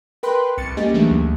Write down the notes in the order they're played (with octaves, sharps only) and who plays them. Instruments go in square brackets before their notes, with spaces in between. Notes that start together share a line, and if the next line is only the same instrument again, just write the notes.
[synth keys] A#4 B4 G5 B5 C6 F#6
C2 F2 A6 C#7
G3 A#3 C#4 G4 G#4 D#5
E3 F#3 G3 A3 A#3 D4
D2